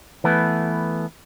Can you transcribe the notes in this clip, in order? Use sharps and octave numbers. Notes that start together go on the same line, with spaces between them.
E3 A3 B3